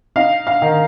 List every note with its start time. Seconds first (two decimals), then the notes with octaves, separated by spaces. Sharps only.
0.16 D#4 F5
0.47 F5
0.62 D#3